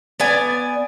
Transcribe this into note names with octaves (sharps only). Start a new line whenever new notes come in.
B3 D5 G#5